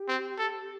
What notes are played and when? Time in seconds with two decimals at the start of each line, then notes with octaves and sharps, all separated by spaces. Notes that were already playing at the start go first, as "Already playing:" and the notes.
Already playing: G4
0.08 C4
0.38 A4